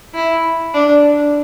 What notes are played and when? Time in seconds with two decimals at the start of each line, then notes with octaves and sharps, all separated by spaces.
0.14 E4
0.73 D4